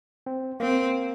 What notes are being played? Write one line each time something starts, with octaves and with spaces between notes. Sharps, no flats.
C4
A#3 C4